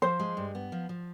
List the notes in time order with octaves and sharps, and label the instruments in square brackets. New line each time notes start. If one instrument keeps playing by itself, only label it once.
[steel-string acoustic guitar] F3 [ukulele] C5
[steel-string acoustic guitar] G#3
G2
B3
F3
F3